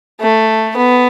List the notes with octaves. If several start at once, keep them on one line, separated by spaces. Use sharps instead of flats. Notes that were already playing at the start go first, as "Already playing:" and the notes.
A3
B3